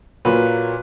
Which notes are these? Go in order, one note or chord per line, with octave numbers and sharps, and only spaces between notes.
A#2 F#3 A#3 B4